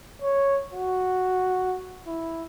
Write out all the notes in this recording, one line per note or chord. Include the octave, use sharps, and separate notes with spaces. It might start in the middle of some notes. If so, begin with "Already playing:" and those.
C#5
F#4
E4